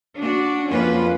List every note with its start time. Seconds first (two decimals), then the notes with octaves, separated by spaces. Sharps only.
0.18 D4 F#4
0.69 F2 A#3 C#4 F4 B4